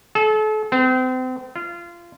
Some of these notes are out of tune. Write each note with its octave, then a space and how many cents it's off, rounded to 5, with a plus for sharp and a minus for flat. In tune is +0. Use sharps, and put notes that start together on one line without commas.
A4 -35
C4 -35
F4 -25